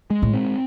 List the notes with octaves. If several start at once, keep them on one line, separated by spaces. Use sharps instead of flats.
G#3
A2
C4